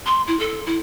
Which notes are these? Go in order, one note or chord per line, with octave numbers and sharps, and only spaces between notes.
C6
E4
A4
E4